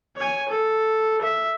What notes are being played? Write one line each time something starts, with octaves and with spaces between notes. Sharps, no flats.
C#5 G#5
A4
E5